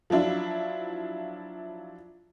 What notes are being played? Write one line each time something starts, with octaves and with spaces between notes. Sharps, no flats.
F3 F#3 D4 E4 F4